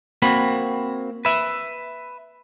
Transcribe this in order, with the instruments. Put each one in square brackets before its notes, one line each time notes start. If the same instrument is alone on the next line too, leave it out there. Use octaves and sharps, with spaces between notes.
[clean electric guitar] A#3 C4 F#4 B5
B4 E5